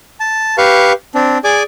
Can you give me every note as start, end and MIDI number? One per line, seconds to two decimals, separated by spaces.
0.20 0.56 81
0.58 0.93 67
0.58 0.93 71
0.58 0.93 77
0.58 0.93 85
1.15 1.38 60
1.15 1.38 62
1.44 1.63 68
1.44 1.63 74
1.44 1.63 80
1.44 1.63 86